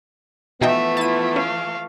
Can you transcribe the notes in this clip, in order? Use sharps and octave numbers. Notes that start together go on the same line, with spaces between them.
B2 E3 F3 A3 B3 D#4 E5 G5
E4 F4 A5 D#7
C#4 F5